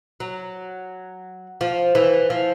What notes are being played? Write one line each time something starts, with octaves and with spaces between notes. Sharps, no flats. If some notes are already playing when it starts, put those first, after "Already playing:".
F#3
F3
E3
F3